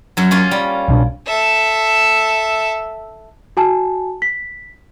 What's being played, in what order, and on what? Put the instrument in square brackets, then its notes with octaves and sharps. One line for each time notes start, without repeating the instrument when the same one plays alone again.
[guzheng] F#2 F#3
A#3 C#4 F4
G3
[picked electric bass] C2 B2 D4
[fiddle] A4 E5
[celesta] F#4 G#5 A5
B6